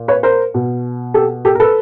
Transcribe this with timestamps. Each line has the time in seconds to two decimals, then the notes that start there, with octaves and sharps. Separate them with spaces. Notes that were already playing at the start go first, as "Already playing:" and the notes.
Already playing: A#2
0.08 B4 C#5
0.23 A#4 C5
0.54 B2
1.14 G4 A4
1.45 G4 A4
1.55 A#4
1.60 A4 B4